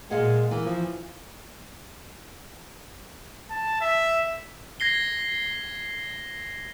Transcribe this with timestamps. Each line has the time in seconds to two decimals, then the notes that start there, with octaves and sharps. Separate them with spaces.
0.11 A#2 G#3 F5 F#5
0.51 E3 A#3
0.66 F3
3.50 A5
3.81 E5
4.80 G#6 A#6 C7 G7